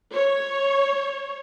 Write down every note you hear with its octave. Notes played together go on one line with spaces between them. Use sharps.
C#5